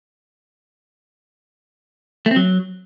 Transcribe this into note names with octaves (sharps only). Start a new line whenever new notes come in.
A3
C4
F#3